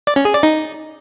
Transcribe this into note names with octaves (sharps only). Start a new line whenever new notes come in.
D5
C#4
G#4
D5
D#4